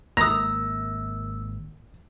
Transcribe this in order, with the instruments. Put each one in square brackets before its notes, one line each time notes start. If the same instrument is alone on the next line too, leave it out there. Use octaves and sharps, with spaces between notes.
[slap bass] G#1 [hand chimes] A#3 E6 [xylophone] A#5 D#6 [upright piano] A#6